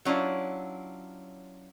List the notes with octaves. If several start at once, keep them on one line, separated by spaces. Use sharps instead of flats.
F#3 C#4 D4 E4 F4